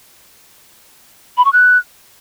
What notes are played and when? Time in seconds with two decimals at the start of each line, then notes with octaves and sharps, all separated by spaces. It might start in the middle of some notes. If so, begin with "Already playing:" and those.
1.37 B5
1.45 C#6
1.53 F#6